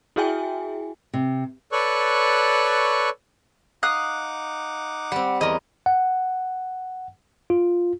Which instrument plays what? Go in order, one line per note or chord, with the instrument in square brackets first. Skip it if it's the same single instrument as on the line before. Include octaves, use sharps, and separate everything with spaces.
[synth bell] E4 F#4 G#4 E5 G5 G#5
[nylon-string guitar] C3
[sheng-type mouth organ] A4 B4 C#5 D5 C#6 F#6
[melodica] D#4 F#5 D6 [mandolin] F5 D#6 F#6
[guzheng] G3 C4 [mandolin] F#5
[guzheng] E2 A#4 [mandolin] D#5
[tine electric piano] F#5
F4